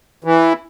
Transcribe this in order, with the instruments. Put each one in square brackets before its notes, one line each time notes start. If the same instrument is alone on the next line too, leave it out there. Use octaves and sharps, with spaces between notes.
[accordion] E3